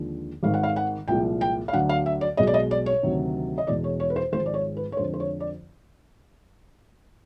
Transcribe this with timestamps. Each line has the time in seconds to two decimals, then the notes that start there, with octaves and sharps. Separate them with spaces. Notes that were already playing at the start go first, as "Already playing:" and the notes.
Already playing: D#2 D3 F3 G#3
0.43 G#1 G#2 D#3 F5
0.54 F#5
0.63 F5
0.76 F#5
1.08 C2 A#2 F3 G#3 G5
1.41 G5
1.68 F5
1.73 D2 D3 F#3 F#5
1.89 F5
2.06 E5
2.21 D5
2.37 B1 B2 G#3 D#5
2.47 D5
2.54 D#5
2.71 D5
2.86 C#5
3.03 D2 C3 D#3 F#3
3.58 D#5
3.67 E2 B2 G#3 D5
3.84 C#5
4.00 C#5
4.10 B4
4.16 C5
4.32 G#1 G#2 F3 G#3 C5
4.46 D5
4.54 C#5
4.77 B4
4.92 C#5
4.97 F2 D3 F3 G#3 C5
5.14 C5
5.20 C#5
5.40 D5